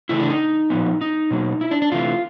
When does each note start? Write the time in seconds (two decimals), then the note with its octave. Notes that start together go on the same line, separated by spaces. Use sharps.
0.09 C#3 E3 A3 E4
0.20 D4
0.30 D#4
0.70 A#2 F3 G#3 B3
1.01 D#4
1.31 B2 F#3 A#3
1.61 E4
1.71 D4
1.82 D4
1.92 C3 E3 A3 F4